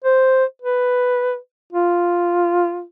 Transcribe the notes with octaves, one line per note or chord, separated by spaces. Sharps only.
C5
B4
F4